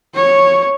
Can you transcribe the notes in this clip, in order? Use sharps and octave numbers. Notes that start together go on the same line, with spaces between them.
C#5